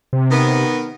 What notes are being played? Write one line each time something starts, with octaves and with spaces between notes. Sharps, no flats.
C3
D#3 B3